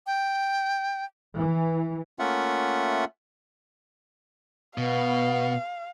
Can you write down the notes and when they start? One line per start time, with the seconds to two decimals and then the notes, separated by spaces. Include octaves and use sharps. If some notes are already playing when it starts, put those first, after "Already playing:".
0.07 G5
1.36 E3
2.19 A3 A#3 C#4 F4 E5 F#5
4.78 B2 B3 F5